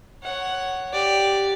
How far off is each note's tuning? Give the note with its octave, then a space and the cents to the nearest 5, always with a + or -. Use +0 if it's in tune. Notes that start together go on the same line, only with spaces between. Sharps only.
C#5 +0 F#5 +10
G4 +0 D5 +0